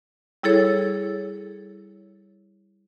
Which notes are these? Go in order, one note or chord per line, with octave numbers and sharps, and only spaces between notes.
G3 E4 G#4 A4 C#5